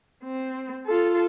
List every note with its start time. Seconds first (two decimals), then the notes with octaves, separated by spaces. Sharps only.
0.24 C4
0.87 F4 A4